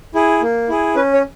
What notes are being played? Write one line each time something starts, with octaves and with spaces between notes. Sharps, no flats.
E4 G#4
A#3
E4 G#4
C#4 B4
C#5